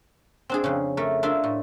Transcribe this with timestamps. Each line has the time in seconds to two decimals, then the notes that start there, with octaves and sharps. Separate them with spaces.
0.49 C4 D4 G#4
0.64 F2 C#3
0.97 A3 A#4
1.23 D4 F4 A#4 E5
1.44 A2